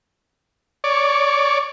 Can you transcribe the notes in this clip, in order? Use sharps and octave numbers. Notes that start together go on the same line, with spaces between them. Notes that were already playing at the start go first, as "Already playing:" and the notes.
C#5 D5